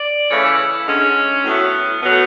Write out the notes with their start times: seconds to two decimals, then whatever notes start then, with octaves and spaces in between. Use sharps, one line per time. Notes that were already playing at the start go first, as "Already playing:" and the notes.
Already playing: D5
0.30 C#3 E3 A3 C#5
0.44 E4
0.87 D3 G#3 C#4
1.44 A2 F#3 A3 B3
2.02 B2 F#3 A3 B3